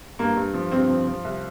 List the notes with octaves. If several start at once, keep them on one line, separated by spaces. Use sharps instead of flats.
G2 A#3
G2
F3
G2 C4
F3
F3
C2